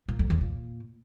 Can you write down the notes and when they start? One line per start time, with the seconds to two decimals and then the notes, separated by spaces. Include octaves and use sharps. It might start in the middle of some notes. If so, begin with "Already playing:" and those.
0.08 A#2
0.19 F2
0.30 E2
0.41 A#2